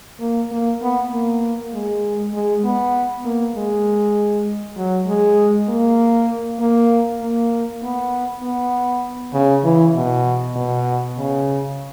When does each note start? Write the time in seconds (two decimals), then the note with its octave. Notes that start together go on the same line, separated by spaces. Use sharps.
0.20 A#3
0.51 A#3
0.82 B3
1.12 A#3
1.73 G#3
2.34 G#3
2.64 B3
3.25 A#3
3.56 G#3
4.77 F#3
5.07 G#3
5.69 A#3
6.60 A#3
7.22 A#3
7.82 B3
8.43 B3
9.34 C#3
9.64 E3
9.95 B2
10.56 B2
11.17 C#3